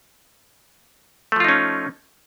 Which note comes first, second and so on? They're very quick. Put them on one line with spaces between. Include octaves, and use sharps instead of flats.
A3 F3 F4 D#4 C#4